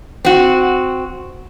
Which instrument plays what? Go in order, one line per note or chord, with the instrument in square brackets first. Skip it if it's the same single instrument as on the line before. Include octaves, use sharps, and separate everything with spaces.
[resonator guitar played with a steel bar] C4 F#4